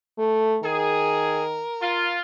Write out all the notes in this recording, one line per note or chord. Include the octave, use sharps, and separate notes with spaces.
A3
D#3 G#4 A#4
F4